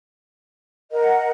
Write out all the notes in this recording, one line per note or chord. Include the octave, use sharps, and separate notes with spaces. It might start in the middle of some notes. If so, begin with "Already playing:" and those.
A#4 D#5 F#5